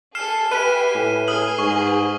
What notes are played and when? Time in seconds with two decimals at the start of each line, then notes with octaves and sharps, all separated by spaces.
0.15 G#4 A4 F6 C7 E7
0.51 G4 B4 E5 G#5 D#7
0.95 A2
1.28 G#4 G#5 D#6 F6 F#7
1.59 G#2 C#6